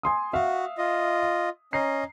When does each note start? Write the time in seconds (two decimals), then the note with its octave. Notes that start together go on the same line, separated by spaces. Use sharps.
0.03 G#5 C6 D#6
0.33 F#4 E5 F5
0.78 F4 D#5
1.73 C#4 D#5 A#5 C7